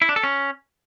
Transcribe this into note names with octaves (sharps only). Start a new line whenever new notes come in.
E4
D4
A4
C#4